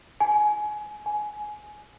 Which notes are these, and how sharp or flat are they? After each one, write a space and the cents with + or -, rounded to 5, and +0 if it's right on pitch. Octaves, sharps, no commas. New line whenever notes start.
G#5 +20
G#5 +15